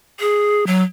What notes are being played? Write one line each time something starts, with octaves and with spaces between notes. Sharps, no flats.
G#4
F#3